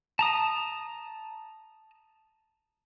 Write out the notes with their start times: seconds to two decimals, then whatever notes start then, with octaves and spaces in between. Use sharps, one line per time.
0.19 A5 A#5 D#6